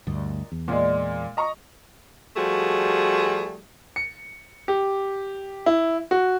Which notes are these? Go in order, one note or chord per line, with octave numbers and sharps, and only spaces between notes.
D2 G2 A#2 D#5
E2
A#2 G#3 D5 F5
D#5 A#5 C#6
F3 G3 A3 F#4 G#4
C#7
G4
E4
F#4